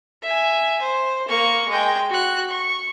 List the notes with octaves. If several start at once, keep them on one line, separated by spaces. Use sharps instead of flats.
E5 G#5
C5
A#3 C#6
G#3 G5
F#4 F#6
C#6